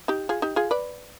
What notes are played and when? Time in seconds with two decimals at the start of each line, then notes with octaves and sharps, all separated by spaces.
0.08 D#4 G4
0.29 F4 G#4
0.42 D#4 G4
0.56 F4 G#4
0.71 B4 D5